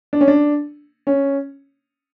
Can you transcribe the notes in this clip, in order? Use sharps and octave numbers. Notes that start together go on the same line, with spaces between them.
D4
C#4
D4
C#4